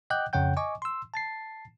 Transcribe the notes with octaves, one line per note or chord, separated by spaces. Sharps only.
D#5 F#5 G5 D6 F#6 G6
F2 C#3 C#5 F#5 G5 G6
D#5 G#5 C#6 D6
C6 E6
A5 A6 C7